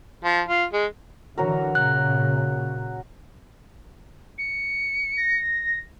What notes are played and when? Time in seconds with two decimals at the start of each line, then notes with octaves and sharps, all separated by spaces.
0.25 F3
0.49 F4
0.73 G#3
1.38 D3 E3 F#3 F#4 A#4
1.75 A#2 C#3 F#6
4.38 C#7
5.17 A#6